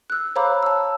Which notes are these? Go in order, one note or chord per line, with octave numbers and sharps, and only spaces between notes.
E6 F#6
C5 C#5 F5 A#5 B5 D6
A5 E6